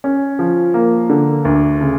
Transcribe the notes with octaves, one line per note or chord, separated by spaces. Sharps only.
C#4
F3
A#3
D3
D2
C#3